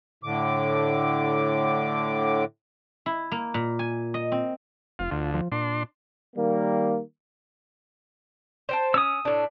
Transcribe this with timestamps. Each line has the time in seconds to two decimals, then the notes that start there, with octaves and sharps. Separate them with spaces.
0.24 A2 D3 D6
3.06 E4
3.31 A#3
3.54 A#2
3.79 G#5
4.14 D#5
4.32 C4
4.99 F1 F4
5.11 D2 F4
5.34 F3
5.52 A#2 D4 C6
6.36 D#3 G3 A#3
8.69 C5 G5 A5
8.94 C#4 D#6 E6
9.25 A2 D4